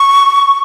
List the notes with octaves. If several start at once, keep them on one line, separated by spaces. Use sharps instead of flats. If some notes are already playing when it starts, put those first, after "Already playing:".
Already playing: C#6